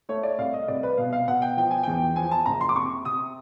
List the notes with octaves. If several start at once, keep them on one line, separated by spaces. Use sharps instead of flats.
A3 C#5
D5
C2 F5
D#5
C2 D5
B4
B2 F5
F5
B2 F#5
G5
F3 G5
G#5
E2 G5
F3 G#5
A5
F#1 A#5
C6
D6
C3 C#6
C3 D#6